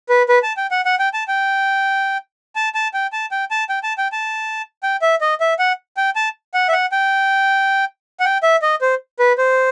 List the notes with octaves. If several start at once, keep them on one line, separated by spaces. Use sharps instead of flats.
B4
B4
A5
G5
F#5
F#5
G5
A5
G5
A5
A5
G5
A5
G5
A5
G5
A5
G5
A5
G5
E5
D#5
E5
F#5
G5
A5
F#5
E5
F#5
G5
F#5
G5
E5
D#5
C5
B4
C5